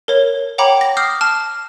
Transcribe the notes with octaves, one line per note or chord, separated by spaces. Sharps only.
A#4 C#5
C#5 F#5 G5 A#5 B5 D6
A#6
D6 D#6 F6 G6 C7
A5 F6